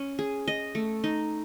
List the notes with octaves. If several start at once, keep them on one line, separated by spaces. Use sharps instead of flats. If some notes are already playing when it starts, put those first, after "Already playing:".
Already playing: C#4
G#4
D#5
A3
D#4